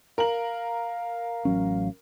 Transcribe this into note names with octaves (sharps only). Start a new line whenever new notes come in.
A#4 F5 F#7
A1 F#3 C#4